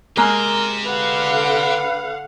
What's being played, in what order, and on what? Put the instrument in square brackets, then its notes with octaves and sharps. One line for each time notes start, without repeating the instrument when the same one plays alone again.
[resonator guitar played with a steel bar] G#3 A#3 A#5 [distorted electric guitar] G4 C6 [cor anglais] A#4
[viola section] D3 F5 F#5 [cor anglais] B4